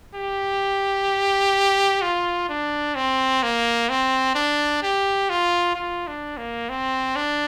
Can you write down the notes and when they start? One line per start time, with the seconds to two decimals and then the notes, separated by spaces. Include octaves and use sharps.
0.15 G4
2.02 F4
2.49 D4
2.95 C4
3.43 A#3
3.89 C4
4.35 D4
4.83 G4
5.29 F4
5.75 F4
6.07 D4
6.37 A#3
6.70 C4
7.16 D4